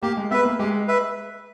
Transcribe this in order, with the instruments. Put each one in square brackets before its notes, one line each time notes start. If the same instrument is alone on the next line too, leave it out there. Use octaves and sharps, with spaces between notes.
[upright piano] A#3 [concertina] G4
[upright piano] G#3
[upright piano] B3 [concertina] B4 E5
[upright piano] A#3
[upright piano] G#3 [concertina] G4
[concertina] B4 E5